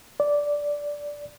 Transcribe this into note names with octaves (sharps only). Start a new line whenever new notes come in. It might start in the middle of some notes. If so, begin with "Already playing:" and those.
D5